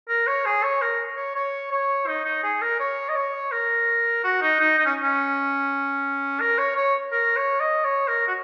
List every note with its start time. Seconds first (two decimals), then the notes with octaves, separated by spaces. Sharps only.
0.09 A#4
0.27 C#5
0.46 G#4
0.63 C#5
0.82 A#4
1.17 C#5
1.36 C#5
1.72 C#5
2.07 D#4
2.25 D#4
2.43 G#4
2.61 A#4
2.80 C#5
3.09 D#5
3.16 C#5
3.52 A#4
4.24 F#4
4.42 D#4
4.60 D#4
4.78 D#4
4.86 C#4
5.02 C#4
6.40 A#4
6.58 C#5
6.76 C#5
7.12 A#4
7.36 C#5
7.60 D#5
7.84 C#5
8.08 A#4
8.28 F#4